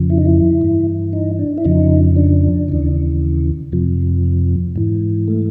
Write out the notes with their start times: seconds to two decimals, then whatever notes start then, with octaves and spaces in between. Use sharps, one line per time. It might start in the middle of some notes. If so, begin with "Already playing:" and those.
Already playing: F2 C#3 F3
0.10 E4
0.18 D#4
0.26 E4
0.61 G2 E3
1.13 D#4
1.39 D4
1.58 E4
1.65 F2 C#3 F3 D#4
2.16 D4
2.68 D#2 C#3 E3
3.72 F2 C3 F3
4.76 G#2 E3
5.28 A3